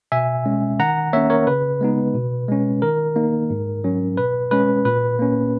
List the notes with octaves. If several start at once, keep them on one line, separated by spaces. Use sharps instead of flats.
B2 E5 G#5
G#3 C#4
D#3 F#5 A#5
A#3 C#4 C#5 E5
A#4 C#5
C#3 B4
G#3 B3 D#4
B2
G#3 C#4
D#3 A#4
A#3 D#4
G#2
F#3 C#4
B2 B4
G#3 C#4 B4
A#2 B4
A#3 C#4